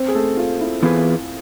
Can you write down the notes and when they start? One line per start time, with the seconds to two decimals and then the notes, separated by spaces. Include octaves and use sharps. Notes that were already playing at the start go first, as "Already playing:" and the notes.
Already playing: C4 C5
0.08 G#4
0.14 A3 A4
0.37 F4
0.61 E4
0.83 E3 B3 F4 G#4 B4